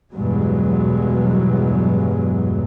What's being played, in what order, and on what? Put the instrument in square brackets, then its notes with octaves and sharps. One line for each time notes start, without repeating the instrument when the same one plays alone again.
[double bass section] E2 G2 B2 F#3 G#3